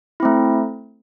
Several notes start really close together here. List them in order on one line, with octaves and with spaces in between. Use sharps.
E4 C4 A3